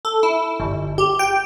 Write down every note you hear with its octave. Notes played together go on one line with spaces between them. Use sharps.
A4
E4
G1
G4
G5